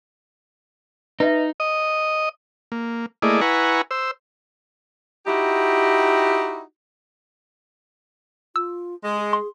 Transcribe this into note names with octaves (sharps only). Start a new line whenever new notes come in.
D#4 B4 D#5 E5
D#5
A#3
A3 A#3 E4 G#4 D5 D#5
E4 B4 F#5 G#5 A#5 C#6
C5 E6
D#4 E4 F#4 G4
F4 E6
G#3
G#4
C6